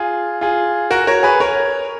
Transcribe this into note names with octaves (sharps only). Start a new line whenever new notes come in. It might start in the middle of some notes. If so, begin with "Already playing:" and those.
Already playing: F4 G#4
F4 G#4
F#4 A#4
A#4 C#5
G#4 B4
A#4 C#5